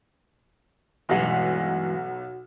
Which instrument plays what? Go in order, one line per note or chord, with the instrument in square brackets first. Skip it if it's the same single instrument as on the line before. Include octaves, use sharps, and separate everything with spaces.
[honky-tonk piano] B1 F#3 F#5 [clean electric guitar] G2 E3 G#3